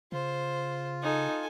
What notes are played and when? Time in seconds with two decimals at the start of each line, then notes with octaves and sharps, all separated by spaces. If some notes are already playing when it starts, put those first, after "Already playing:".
0.12 C#3 F4 C5
1.03 D#4 A4 G#5